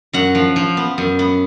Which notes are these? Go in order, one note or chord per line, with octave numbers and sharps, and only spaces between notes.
F#2 F#5
F3
F3
B3
F#2
B3